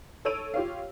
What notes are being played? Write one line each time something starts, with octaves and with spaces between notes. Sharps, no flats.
A4 C#5 E6 D7 D#7 F7
F4 G4 C#5 F5